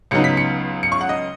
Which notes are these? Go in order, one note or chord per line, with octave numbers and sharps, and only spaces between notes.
C#2 C#3 F#3 B3 D#4 C#7
B6
C#7
C#7
C#6
F#5
D#5